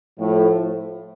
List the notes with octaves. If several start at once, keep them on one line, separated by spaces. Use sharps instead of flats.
A2 F3 A3